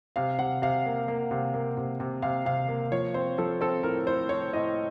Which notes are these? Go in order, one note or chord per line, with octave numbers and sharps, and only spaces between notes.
C3 F5
C3 F#5
C3 F5
A#3
A#3
C3
A#3
C3
C3
C3 F5
C3 F5
A#3
F3 C#5
C4 C5
F3 A4
C4 A4
A2 A#4
A2 C5
A2 C#5
A2 D#5